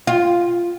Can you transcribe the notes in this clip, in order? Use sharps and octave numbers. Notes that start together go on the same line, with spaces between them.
F4